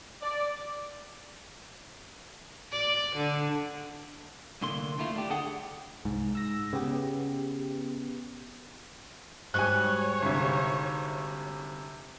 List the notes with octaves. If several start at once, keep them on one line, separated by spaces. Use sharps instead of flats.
D5
D5
D3
C2 A2 D3 A#3 C6
D#3 A3 A#3 E4 F4
D4 G4
D2 D4 G#4 A4 F#5 G5
C2 G#2
E6 A#6
C#3 B3 G4
G#2 F#3 G3 C#5 G#5 F#6
G1 C3